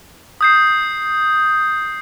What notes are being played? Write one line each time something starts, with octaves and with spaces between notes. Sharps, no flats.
D#6 G6 C7